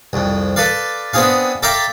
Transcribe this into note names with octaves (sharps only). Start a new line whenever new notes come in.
C2 F2
A4 B4 D5 F5
B3 C4 D4 G#4 F5
A4 D5 E5 F5 G5 A#5